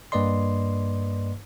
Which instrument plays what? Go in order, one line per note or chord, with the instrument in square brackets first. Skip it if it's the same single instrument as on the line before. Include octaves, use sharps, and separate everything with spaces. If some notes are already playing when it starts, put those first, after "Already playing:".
[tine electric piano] G2 A#3 B4 D5 D#5 C6